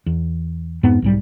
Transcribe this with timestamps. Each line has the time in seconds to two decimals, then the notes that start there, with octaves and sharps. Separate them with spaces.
0.06 E2
0.83 F2 G#2 B3
1.02 B1 G#2 G3